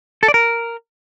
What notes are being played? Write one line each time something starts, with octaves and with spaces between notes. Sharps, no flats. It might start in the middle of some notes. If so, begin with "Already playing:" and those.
A4
D5
A#4